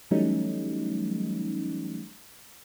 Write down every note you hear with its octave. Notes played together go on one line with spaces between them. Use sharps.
E3 F#3 G3 A3 C#4 D#4